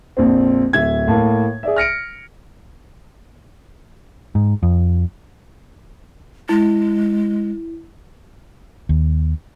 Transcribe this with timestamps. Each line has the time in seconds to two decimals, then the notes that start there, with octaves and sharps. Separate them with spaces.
0.17 A#1 F2 C4
0.73 D1 E5 G#6
1.08 A2 A#3 A5
1.63 G#4 D5 E5
1.76 F6 A#6 C#7 D7
4.35 G#2
4.63 F2
6.49 G#3 E4
8.89 D#2